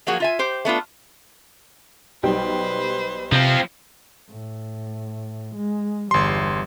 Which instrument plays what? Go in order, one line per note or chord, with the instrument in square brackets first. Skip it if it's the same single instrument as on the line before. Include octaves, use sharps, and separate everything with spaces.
[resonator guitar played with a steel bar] F3 F#3 A#3 F#4 G#4
F4 E5 G#5
G4 C5
A3 B3 D4 F4
[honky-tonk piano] B1 G3 G5 [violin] B4 C5
[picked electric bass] C3 [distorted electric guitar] F3 C4
[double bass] A2
G#3
[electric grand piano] G1 C6 [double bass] E2 G3